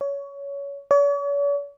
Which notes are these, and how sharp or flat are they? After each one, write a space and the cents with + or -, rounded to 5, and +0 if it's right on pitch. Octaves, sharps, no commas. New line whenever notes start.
C#5 +20
C#5 +45